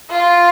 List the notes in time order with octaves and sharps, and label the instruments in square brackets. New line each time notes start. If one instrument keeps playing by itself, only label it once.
[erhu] F4